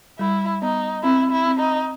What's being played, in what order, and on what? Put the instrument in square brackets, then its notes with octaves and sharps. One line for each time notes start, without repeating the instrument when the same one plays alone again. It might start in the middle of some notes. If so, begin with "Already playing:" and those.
[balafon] G3 [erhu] E4
[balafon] B3 [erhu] D#4
[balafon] C4 [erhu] E4
[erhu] E4
[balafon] C4
[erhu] D#4